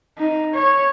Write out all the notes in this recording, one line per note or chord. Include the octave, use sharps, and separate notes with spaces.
D#4
C#5